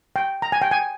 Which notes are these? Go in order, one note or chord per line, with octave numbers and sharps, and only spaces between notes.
G5
A#5
G#5
G5
G#5